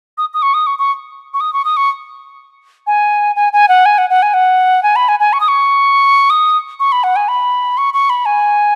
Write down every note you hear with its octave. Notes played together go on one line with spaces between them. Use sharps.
D#6
D#6
C#6
D#6
C#6
C#6
C#6
D#6
C#6
D#6
C#6
G#5
G#5
G#5
F#5
G#5
F#5
F#5
G#5
F#5
G#5
B5
G#5
G#5
C#6
D#6
C#6
D#6
C#6
B5
F#5
G#5
B5
C#6
C#6
B5
G#5